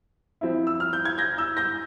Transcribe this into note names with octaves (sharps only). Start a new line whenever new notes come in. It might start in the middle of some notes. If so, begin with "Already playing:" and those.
F3 C4 E4
E6
F6
G6
G#6
G6 A#6
E6 G6
G6 A#6